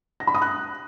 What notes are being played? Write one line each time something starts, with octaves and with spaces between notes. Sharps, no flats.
A#6
B5
D#6
F#6